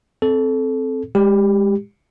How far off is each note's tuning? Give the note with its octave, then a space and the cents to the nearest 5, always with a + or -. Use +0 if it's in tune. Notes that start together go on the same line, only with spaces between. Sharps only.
C4 +0 A4 -15
G#3 -20 G4 +5